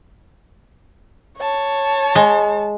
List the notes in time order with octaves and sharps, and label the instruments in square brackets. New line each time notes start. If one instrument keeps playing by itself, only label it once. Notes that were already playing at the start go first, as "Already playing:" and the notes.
[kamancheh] C#5 A5
[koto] G#3